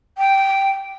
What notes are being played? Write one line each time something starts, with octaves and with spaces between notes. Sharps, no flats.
G5